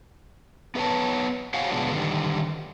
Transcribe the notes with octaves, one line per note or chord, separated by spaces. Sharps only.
B3 A4 B4 C#5 A5
F#4 C5 C#5 F5 F#5 G#5
B2 D3 F3 G#3 B3 D4
D3 D#3 G3